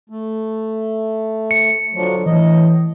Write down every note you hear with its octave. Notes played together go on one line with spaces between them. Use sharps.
A3
C#7
D3 F3 F#3
A2 E3 D#5